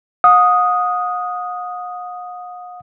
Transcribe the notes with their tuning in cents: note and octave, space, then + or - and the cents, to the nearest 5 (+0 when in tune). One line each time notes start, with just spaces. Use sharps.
F#5 -45 D#6 +0